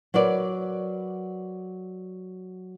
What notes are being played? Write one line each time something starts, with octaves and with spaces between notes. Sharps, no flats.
F#3 A#4 B4 D5